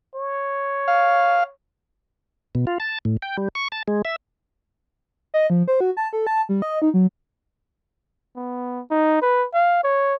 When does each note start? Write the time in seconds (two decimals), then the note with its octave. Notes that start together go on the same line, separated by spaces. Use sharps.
0.15 C#5
0.88 F5
2.55 B2
2.67 F4
2.80 A5
3.05 A2
3.22 G5
3.38 G3
3.55 C#6
3.72 A5
3.88 G#3
4.05 E5
5.34 D#5
5.50 F3
5.68 C5
5.81 F#4
5.97 A5
6.13 A4
6.27 A5
6.49 G3
6.62 D#5
6.82 D#4
6.94 F#3
8.36 B3
8.90 D#4
9.22 B4
9.54 F5
9.84 C#5